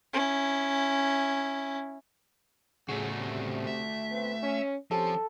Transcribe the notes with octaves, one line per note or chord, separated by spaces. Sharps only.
C#4 E4
A2 C#3 F3 A3 F#4 G#4 C#5
C3
E5
B3 C4 B4
C#4
F3 C4 C#4 G4 A4